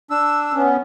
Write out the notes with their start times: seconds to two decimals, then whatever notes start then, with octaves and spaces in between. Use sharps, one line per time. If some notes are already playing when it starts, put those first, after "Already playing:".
0.10 D4 E6
0.53 B3 C#4